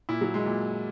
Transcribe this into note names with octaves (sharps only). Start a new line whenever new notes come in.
A#2 E4
F#3
G#3
A#2